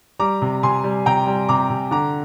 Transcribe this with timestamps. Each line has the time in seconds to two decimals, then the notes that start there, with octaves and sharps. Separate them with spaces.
0.20 G3 A#5 D6
0.42 C3
0.63 C3 G#5 C6
0.84 G3
1.06 C3 G5 A#5
1.27 G3
1.49 C3 A#5 D6
1.70 C3
1.91 D3 A#5 D6